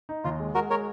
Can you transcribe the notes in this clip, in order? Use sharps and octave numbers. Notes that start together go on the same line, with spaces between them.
D#4
D#2 F4
G#3
G#3 F#4 A#4
G#3 A#4 C#5